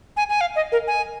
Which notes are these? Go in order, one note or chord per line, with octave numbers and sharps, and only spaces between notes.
G#5
G#5
F5
D#5
A#4
G#5